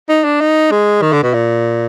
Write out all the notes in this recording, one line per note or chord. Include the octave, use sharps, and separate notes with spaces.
D#4
D4
D#4
G#3
D#3
D3
B2
A#2